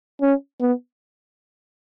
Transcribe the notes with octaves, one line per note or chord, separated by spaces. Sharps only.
C#4
B3